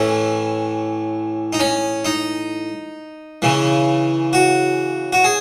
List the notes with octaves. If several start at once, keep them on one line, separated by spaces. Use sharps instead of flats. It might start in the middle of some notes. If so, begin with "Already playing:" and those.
Already playing: A2 E3 C#4
D#4
C#4
D#4
C#3 E3
F#4
F#4
G#4